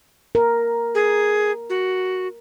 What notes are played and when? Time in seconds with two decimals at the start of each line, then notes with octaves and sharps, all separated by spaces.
0.35 A#4
0.95 G#4
1.70 F#4